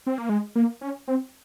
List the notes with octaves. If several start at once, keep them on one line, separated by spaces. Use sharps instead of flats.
C4
A#3
G#3
A#3
C#4
C4